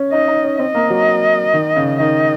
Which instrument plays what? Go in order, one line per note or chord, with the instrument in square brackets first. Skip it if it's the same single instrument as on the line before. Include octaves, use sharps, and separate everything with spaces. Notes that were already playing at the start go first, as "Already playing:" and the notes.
Already playing: [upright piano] C#4
[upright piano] D#4 [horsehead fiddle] D#5
[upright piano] D#4
C#4
[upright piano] C4 [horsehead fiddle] D#5
[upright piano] A#3
F#3
D#3
C#3
[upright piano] D#3 [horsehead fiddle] D#5